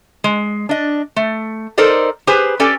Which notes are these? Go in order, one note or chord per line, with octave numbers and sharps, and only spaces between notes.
G#3
D4 D#5
A3
D#4 A4 A#4 C5 D5 D#5
G4 G#4 B4 C5 G#5
C#4 G4 A4 D5 G#5